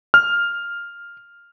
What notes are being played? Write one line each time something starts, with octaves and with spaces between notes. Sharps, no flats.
F6